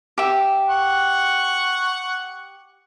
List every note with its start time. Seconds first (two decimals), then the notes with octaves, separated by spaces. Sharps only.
0.18 G4 E5
0.69 F#5 C#6